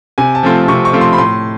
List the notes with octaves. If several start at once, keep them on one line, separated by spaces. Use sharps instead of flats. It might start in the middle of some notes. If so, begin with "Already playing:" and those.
C3 G#5
A5
F3 A3 C4 F4
C3 C#6
C#6
F3 A3 C4 F4
C6
B5
A2 C6